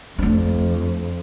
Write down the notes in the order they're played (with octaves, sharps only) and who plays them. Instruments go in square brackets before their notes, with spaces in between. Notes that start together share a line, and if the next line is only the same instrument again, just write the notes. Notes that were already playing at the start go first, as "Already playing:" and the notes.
[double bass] F2 [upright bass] A3 D4